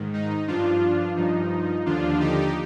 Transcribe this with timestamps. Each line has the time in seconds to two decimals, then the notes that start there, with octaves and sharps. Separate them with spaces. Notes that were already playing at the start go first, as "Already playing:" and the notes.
Already playing: G#2 D#3
0.13 D#4
0.47 G2 F3 D4 F4
1.16 G2 F3 D#4
1.86 D#2 D3 F3 D4 F4
2.19 D#4 G4